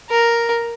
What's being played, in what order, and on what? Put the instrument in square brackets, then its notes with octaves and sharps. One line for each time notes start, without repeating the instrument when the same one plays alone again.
[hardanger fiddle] A#4